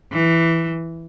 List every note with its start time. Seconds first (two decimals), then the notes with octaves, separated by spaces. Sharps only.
0.13 E3